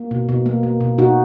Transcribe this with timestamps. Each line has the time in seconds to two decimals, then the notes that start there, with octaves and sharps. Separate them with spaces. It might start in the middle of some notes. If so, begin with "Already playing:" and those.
Already playing: A#3
0.11 B2
0.29 B2
0.46 A#3
0.63 A#3
0.80 B2
0.98 B2 D#4 F#4